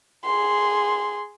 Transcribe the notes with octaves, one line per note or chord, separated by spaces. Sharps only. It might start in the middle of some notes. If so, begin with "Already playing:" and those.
G#4 C6